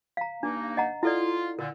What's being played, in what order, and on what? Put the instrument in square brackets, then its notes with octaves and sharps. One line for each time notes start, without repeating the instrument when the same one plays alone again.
[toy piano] F5 A#5
[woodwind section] G2 A#3 D#4 [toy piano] D4
[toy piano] D#5 F#5 A#5
[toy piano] E4 A4 D5 [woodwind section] F4
[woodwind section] A#2 D3 [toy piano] A#4